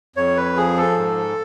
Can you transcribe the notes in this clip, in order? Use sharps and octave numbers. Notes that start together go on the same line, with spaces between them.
F2 C#5
B4
F3 G#4
A4
G#2